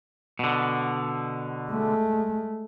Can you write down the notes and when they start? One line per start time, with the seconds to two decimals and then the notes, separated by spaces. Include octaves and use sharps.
0.39 B2 D3
1.70 G#3 A3